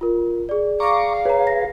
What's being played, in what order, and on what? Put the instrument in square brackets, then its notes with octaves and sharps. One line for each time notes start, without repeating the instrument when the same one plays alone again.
[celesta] F4 A#4
G#4 D5
[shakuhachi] F5 [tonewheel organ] A#5 C#6 D6
[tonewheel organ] G#4 B4 [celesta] C#5 A#5
[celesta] A#6